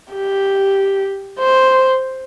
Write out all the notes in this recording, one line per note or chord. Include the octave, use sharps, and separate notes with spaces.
G4
C5